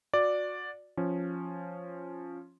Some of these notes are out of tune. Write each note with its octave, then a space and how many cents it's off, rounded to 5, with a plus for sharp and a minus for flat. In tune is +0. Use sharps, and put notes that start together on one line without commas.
F#4 -25 D5 +0
F3 +0 C#4 -5